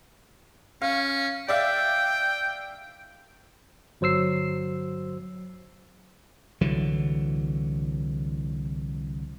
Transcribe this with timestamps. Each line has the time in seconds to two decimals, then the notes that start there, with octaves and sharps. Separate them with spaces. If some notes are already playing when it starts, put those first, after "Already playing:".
0.82 C#4 F5
1.48 D5 E5 F5 G5
4.01 G1 F#3 C5 E6 C7
6.61 C2 D3 E3 F#3